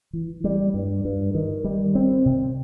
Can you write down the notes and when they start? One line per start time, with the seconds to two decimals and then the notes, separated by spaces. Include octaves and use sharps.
0.13 E3
0.44 G3
0.74 G2
1.05 G2
1.35 D#3
1.64 G3
1.95 C4
2.26 C3